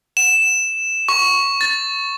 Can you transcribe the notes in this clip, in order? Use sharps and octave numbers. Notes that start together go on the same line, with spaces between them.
E7
C#6
A6